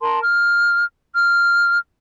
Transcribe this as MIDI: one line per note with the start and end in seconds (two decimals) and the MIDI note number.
0.02 0.19 70
0.02 0.19 81
0.02 0.19 84
0.22 0.86 89
1.14 1.77 89